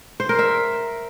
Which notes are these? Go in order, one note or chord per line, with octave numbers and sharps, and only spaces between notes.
C5
A#4
E5